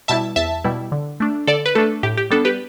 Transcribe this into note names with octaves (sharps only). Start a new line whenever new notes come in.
B2 G3 E4 E5 A5
E2 E5 A5
B2 G3 E4
D3
A3 D4
D3 A4 D5
B4
A3 D4 A4
A2 G4
G4
G3 B3 D4 A4
G4 B4